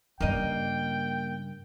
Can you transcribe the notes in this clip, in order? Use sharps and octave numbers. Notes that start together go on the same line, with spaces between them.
G2 C#3 A#3 D#5 G5